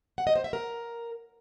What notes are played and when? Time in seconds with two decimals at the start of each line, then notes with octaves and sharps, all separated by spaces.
0.18 F#5
0.27 D#5
0.36 C5
0.44 E5
0.53 A#4